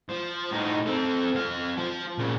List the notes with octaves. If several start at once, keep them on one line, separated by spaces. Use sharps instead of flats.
F3
A2 D#4
C4 A4
F2 F5
F3
A#2 C#3